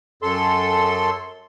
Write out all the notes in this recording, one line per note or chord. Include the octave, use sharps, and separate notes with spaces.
F#2 A4 C6